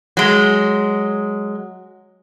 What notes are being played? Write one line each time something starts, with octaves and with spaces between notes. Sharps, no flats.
F#3 G#3